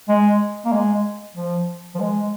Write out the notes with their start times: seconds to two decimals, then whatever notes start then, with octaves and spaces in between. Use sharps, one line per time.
0.08 G#3
0.65 A#3
0.72 G#3
1.36 F3
1.95 F3
2.00 G#3